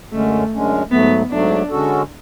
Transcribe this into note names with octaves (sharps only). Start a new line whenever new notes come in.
F#2 D3 G#3 A3 C#4
F#2 D3 G#3 C#4
G#2 F#3 A3 B3
G#2 F#3 A3 D4
D3 G#3 C#4 F#4 A4